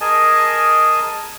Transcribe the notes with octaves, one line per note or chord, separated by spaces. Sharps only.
G#4 A#4 D#5 G#5 A5